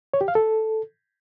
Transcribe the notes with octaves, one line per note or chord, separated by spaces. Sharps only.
C#5
G4
F5
A4